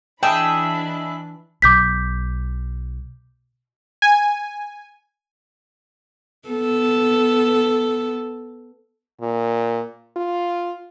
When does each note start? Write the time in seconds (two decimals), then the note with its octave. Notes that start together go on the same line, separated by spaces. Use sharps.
0.23 E3 D4 G#4 D#5 E5 G5 A5 B5
1.62 B1 D6 G6 B6
4.02 G#5
6.49 B3 A4
9.22 A#2
10.17 F4